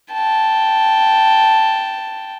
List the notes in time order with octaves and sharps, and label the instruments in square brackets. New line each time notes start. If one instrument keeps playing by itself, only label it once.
[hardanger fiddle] G5 A5